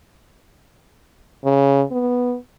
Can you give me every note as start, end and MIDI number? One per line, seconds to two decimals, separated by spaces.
1.45 1.83 49
1.92 2.36 59